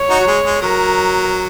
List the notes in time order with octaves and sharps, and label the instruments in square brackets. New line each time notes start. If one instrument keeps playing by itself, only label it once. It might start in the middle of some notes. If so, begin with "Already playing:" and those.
Already playing: [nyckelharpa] C#5
[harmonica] D#4 F#4
F#3
G#3
G#3
[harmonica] F#3 [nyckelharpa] A#4